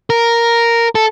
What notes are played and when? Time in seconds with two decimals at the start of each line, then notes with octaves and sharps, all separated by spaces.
0.10 A#4
0.95 A4